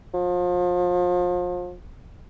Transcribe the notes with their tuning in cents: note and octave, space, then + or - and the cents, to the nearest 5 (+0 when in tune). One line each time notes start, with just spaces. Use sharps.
F3 +35